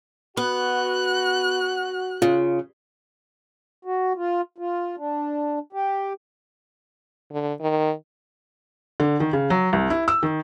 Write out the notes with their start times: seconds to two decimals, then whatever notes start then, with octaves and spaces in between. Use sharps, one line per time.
0.37 B3 F#4 F#6
2.22 C#3 F4
3.85 F#4
4.16 F4
4.58 F4
4.98 D4
5.73 G4
7.31 D3
7.61 D#3
9.00 D3
9.20 D#3
9.33 C#3
9.50 F#3
9.73 C2
9.90 E4
10.08 E6
10.23 D#3